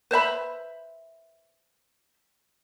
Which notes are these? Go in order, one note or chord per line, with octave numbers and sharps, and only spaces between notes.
B4 C5 E5 B5